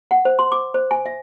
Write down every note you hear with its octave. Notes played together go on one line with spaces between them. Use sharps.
F#5
C5
C6
D6
C5
G#5
E5